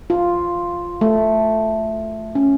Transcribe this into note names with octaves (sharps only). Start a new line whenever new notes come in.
F4
A3
C#4